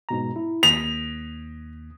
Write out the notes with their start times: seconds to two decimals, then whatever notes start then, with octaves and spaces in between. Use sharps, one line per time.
0.09 G#2 B2 A#5
0.36 E4
0.63 D#2 D#6 B6 F7